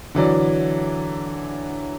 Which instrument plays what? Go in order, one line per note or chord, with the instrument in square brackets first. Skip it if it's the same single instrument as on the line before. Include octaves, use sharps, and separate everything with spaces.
[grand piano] D3 E3 F#3 D5